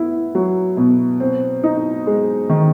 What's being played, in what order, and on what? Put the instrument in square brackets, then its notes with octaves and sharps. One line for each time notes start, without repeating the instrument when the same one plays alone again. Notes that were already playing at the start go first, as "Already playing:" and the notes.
Already playing: [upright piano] B3 E4
F#3
B2
C4
D#4
G#3
D#3